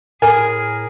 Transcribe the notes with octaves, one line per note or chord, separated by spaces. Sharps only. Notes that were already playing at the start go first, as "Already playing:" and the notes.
A2 G#4 A#4 G#5